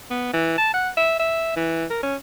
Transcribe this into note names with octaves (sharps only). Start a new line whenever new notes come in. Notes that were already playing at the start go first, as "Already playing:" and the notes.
B3
E3
A5
F#5
E5
E5
E3
A#4
C#4